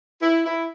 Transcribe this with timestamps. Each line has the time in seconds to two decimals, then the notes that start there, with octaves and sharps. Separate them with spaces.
0.22 E4
0.46 E4